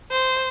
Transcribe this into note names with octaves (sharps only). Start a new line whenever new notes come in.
C5